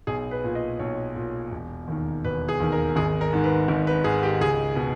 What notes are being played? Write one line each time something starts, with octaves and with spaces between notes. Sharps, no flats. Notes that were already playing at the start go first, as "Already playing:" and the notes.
B1 G#4
B4
A#2
D#5
B1 C#5
A#2
E1
D#2 D#3
E1 B4
G#4
D#2 D#3
A#4
G#1 G#4
A#4
G#2 D#3
B4
G#1
B4
G#2 D#3 G#4
G4
C#2 G#4
B2